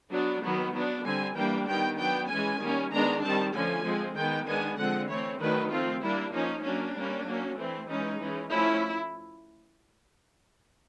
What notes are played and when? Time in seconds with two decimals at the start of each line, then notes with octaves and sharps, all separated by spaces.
0.11 F#3 B3 D4
0.43 D#3 F#3 B3
0.74 F#3 B3 D4
1.05 D3 G3 C4 G#5
1.36 E3 G3 A#3 D4 G5
1.67 D#3 G3 B3 G5
1.98 F#3 B3 D4 G5
2.29 E3 G#3 C#4 G#5
2.60 D#3 G3 A#3 C#4
2.91 D#3 G#3 B3 D4 A#5
3.22 D#3 G3 C4 A5
3.53 D3 F3 A3 C#4 G#5
3.84 F3 G#3 C4
4.16 D#3 G#3 B3 G5
4.46 D#3 G#3 B3 D4 G#5
4.77 D3 F3 G#3 C4 F#5
5.08 E3 A3 C4 C#5
5.39 D#3 F#3 A3 D4 B4
5.71 F3 A3 C4 F4
6.02 G3 A#3 D4 E4
6.33 F3 A#3 C#4 D#4
6.63 F#3 A#3 C#4 D4
6.95 G3 A#3 C#4
7.26 F#3 A#3 C#4
7.57 E3 A3 C4
7.88 E3 G#3 C#4 D#4
8.20 E3 G#3 C#4
8.50 F3 A3 C#4 E4